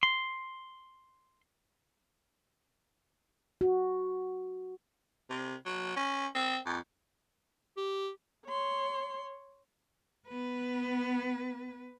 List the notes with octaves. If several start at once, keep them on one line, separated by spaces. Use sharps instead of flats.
C6
F#4
C3
F#3
C#4
C4
F2
G4
C#5 C6
B3 B4